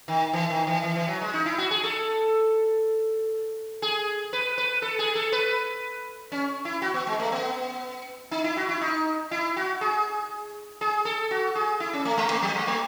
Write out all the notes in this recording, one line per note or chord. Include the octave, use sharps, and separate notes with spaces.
D#3
E3
D#3
E3
E3
E3
F#3
G#3
D#4
E4
F#4
G#4
A4
G#4
B4
B4
A4
G#4
A4
B4
C#4
E4
F#4
B3
G#3
A3
B3
D#4
E4
F#4
E4
D#4
E4
F#4
G#4
G#4
A4
F#4
G#4
E4
C#4
A3
G#3
A3
F#3
G#3
A3